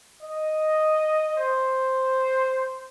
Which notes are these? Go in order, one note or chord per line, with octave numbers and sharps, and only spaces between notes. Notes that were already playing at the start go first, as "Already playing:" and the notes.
D#5
C5